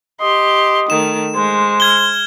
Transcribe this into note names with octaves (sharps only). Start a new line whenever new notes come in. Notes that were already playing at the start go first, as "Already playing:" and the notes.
G4 D#5 C6
D#3 A3 E7
G#3 C5
F6 G#6 G7